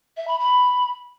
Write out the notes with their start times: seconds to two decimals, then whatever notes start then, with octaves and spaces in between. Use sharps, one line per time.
0.17 E5
0.28 B5
0.40 B5